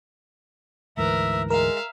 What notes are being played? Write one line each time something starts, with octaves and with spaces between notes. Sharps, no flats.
D2 G#2 E3 A#4 B4 E5
G#3 A#4 E5 F5